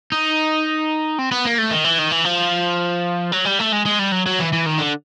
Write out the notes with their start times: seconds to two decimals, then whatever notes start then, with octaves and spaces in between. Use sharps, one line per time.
0.12 D#4
1.19 C4
1.32 B3
1.45 A#3
1.58 A3
1.71 D#3
1.84 E3
1.99 D#3
2.12 E3
2.25 F3
3.32 F#3
3.45 G3
3.59 A3
3.72 G#3
3.85 G#3
3.99 G3
4.12 F#3
4.26 F#3
4.39 E3
4.53 E3
4.66 D#3
4.78 D3